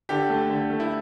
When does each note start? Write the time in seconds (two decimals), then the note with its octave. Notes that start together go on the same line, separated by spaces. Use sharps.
0.09 D3 G4
0.30 A3
0.50 D3
0.70 A3
0.80 E4